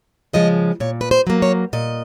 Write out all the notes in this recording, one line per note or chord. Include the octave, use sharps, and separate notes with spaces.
C#3 F3 G#3 D#5
A#2 C#5
B4
C5
F#3 A#3
C#5
A#2 D#5